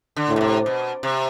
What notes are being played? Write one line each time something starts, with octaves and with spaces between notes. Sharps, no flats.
D3
A2
B2
C3
B2
C3